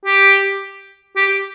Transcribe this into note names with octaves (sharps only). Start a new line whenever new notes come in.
G4
G4